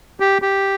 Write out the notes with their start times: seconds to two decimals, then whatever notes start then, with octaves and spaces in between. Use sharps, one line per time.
0.20 G4
0.42 G4